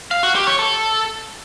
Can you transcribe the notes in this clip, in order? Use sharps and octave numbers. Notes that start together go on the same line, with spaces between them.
F5
F#4
G4
C#5
A4